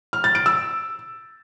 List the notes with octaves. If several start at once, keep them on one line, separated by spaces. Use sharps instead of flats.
F6
A6
D7
E6